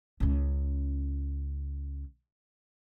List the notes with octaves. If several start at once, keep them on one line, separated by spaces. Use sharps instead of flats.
C#2 C#3